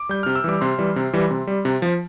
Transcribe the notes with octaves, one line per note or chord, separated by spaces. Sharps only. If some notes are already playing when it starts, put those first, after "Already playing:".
Already playing: D6
G3 G6
C3 F6
E6
E3 G3 D6
C3 C6
E3 G3
C3
E3 G3
C3
G3
C3
F3